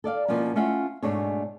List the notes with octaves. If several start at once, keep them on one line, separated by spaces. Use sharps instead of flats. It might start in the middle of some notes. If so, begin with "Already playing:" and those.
A4 D5 E5 F5
B2 F3 A#3 B3 C#4
A3 C#4 F4 E5 F#5
G#2 B2 A3 D4 G#4 C#5